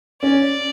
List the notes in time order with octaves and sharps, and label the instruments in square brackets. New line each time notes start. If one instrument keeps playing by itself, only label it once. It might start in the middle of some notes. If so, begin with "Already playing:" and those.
[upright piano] C#4 [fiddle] D5